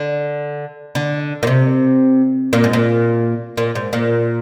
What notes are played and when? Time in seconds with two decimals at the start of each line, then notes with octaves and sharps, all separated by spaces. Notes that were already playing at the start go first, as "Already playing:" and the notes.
Already playing: D3
0.95 D3
1.43 A#2
1.47 C3
2.53 A#2
2.64 G#2
2.73 A#2
3.57 A#2
3.75 G#2
3.93 A#2